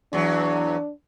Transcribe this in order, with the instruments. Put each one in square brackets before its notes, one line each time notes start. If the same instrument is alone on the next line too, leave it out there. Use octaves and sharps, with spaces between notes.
[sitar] E2 F#3 [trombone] D4